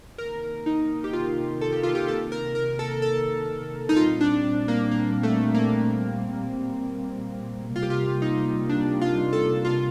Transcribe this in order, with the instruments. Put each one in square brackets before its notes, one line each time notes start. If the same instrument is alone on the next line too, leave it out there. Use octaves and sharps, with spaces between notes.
[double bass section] C3 D#3 A#3 [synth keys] A#4
[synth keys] D#4
G4
F4
A4
G4
F4
G4
A4
A#4
A#4
A4
A4
D#4
[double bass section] A#2 G3 C4 [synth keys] F4
[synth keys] D4
A#3
A#3
A3
A#3
[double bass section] C3 G3 A#3 [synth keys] F4
[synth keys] G4
F4
D#4
D4
F4
A4
F4